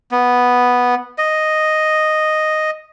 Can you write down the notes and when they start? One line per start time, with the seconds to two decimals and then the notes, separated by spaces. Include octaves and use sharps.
0.12 B3
1.18 D#5